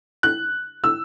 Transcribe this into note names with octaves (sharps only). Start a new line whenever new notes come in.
F#6
E6